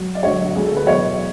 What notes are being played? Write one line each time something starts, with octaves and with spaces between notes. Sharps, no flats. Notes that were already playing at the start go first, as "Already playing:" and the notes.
Already playing: F#3
D5
D2 D3 F#3 C#5
F#4
D2 D3 F#3 G#4
A4
B4
E2 B2 F#3 C#5